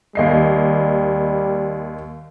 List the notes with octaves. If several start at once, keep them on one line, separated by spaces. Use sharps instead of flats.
D#2 G3 D#5 C7